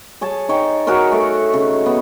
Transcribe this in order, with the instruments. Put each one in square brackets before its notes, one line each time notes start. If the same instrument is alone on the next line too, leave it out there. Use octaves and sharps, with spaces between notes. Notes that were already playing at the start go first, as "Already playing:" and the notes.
[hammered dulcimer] G#4 C#5 A5
D#4 C#5 G5
F#4 G#4 A#4 C#5
A3
C#3
B3